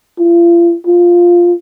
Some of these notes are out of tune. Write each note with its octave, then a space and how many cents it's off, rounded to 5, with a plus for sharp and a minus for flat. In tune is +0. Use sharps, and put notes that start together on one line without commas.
F4 -40
F4 +0